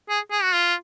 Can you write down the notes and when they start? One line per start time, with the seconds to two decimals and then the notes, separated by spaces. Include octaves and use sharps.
0.09 G#4
0.31 G#4
0.43 F#4
0.54 F4